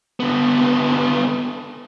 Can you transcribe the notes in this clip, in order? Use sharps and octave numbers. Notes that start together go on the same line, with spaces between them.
D3 B3